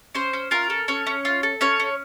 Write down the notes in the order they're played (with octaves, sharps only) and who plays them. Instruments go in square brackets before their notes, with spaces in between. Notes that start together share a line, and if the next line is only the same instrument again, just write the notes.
[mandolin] C#4 C5
C#4
F4 A#4
A4
C#4 C#5
C#4
F4
A4
C#4 C#5
C#4